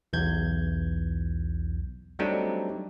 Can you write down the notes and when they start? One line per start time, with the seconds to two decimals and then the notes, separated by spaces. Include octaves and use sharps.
0.13 B1 E2 G6 G#6
2.19 F#3 G3 A3 C4 D4 D#4